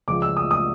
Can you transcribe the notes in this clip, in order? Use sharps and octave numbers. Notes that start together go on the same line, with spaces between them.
C#2 C#3 F3 D6
E6
D#6
D#6